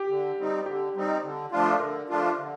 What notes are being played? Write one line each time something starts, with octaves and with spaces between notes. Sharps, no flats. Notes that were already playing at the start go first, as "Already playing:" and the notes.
Already playing: G4
D3
G3 C4 D#4
D3 G4
G3 C4 D#4
D3
F3 A3 D4 F4
A4
D3 A#4
F3 A3 D4 F4
D3